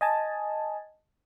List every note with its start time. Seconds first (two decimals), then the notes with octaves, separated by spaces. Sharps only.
0.01 D#5 G#5 A5